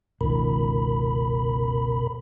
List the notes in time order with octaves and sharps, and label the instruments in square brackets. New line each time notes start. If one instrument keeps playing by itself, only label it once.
[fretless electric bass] F#1 C#2 D#3 [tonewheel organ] B2 A#4 B5